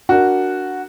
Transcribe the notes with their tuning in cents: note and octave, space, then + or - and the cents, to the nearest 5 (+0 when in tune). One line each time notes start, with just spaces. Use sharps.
D4 +0 F#4 +0 A#4 +0